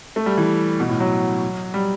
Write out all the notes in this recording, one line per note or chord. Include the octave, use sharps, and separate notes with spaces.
A3
G3
E3
B2
A2
F#3
G3